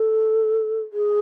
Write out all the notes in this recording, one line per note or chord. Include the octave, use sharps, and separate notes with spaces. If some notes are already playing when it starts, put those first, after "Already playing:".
Already playing: A4
G#4